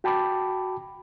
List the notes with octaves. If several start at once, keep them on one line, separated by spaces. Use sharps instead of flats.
F#4 G5 A5 B5 D6